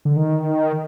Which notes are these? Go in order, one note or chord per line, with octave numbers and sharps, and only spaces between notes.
D3
D#3